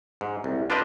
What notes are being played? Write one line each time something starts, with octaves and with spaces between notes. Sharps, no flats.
G#2
C2
D4 F4 B4 C5 D5 D#5